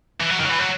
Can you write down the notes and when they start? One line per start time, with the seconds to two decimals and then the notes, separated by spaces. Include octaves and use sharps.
0.20 E3
0.30 F#3
0.40 D#3
0.45 F#3
0.49 E3
0.59 F#3